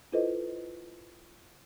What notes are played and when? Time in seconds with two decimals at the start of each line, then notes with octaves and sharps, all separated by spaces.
0.12 E4 F4 A4 B4 C5 D#5